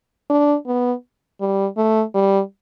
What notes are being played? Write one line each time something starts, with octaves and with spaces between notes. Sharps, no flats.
D4
B3
G3
A3
G3